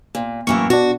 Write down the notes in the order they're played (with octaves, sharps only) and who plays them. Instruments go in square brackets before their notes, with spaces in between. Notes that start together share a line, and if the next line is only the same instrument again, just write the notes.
[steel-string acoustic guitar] A#2
[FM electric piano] F#2 C#6 [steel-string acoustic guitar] A2 E3 A#3
[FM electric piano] B2 D4 [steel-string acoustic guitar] F#4